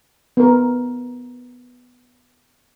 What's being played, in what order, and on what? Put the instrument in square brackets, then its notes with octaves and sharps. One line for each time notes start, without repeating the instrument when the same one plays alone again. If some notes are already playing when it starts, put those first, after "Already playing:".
[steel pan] B3 A#4